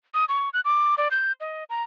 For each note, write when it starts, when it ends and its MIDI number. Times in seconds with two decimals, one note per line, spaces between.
0.14 0.25 87
0.29 0.49 85
0.54 0.61 90
0.65 0.95 86
0.98 1.08 74
1.11 1.32 91
1.40 1.64 75
1.70 1.83 82